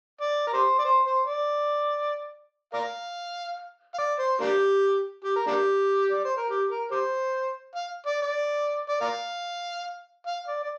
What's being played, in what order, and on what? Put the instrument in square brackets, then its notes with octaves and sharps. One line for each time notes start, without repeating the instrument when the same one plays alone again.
[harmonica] D5
A#4
G4 C5
D5
C5
C5
D5
A#4 D5 F5
F5
D5
C5
A#3 D4 G4
G4
A#4
A#3 D4 G4
D5
C5
A#4
G4
A#4
G4 C5
F5
D5
D5
D5
A#4 D5 F5
F5
D5
D5